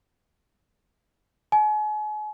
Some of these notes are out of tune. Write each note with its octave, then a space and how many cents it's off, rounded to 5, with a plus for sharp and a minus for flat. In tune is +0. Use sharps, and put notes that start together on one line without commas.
G#5 +40